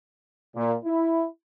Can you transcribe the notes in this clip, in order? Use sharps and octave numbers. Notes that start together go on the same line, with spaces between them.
A#2
E4